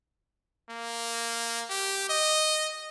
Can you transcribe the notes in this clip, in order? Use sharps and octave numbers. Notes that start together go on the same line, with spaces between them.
A#3
G4
D#5